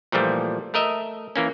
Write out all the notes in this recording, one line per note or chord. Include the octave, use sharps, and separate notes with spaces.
A#2 E3 F3 G3 A3
A3 A#4 D#5 E5
E3 A#3 C#4